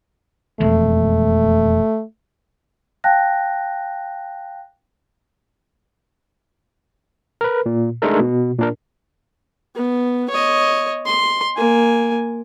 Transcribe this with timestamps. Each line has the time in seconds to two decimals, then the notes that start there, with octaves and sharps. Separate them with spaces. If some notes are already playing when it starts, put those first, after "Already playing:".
0.60 E1 F2 G#3 A3
3.04 F5 G5 A5 F#6 A#6
7.41 A#4 B4
7.66 A#2
8.02 G#3 A3 D4 D#4 A4 A#4
8.20 B2
8.59 A#2 D4 A#4
9.76 B3
10.30 C#5 D#5
11.06 C6
11.57 A#3 G#5